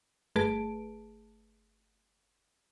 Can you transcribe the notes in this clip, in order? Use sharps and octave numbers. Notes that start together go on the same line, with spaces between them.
G1 A3 G#4 B4 A5 D7